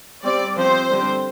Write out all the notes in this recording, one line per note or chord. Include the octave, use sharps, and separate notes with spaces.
G3 C4 D5
F3 C4 C5
D3 G3 C4